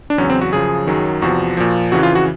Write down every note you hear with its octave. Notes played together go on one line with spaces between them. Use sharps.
D4
E2 C#3 F#3 C#4
C4
F#4
F#2 C#3 F3 G#4
F#2 D#3 F#3
E2 C3 F3 F#4
A#2 F3
F2 C#3 E3 F#4
F4
F#4